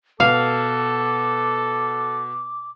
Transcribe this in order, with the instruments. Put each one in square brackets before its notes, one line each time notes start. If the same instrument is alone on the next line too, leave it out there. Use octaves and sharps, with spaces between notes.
[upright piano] B2 [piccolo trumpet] A4 [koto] F5 [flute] D6